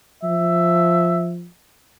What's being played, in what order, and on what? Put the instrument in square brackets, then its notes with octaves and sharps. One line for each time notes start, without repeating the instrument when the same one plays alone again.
[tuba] F3 [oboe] E5